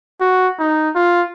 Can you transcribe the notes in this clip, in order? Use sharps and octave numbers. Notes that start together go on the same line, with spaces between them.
F#4
D#4
F4